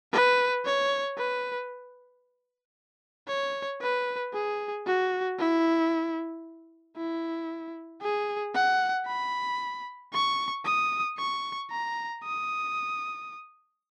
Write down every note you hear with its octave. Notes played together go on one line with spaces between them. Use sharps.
B4
C#5
B4
C#5
B4
G#4
F#4
E4
E4
G#4
F#5
B5
C#6
D#6
C#6
A#5
D#6